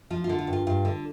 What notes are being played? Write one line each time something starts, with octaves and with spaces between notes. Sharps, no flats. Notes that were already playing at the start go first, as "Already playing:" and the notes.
F3 F4
F4
D3
F4
G2
F4
G2 F4
D3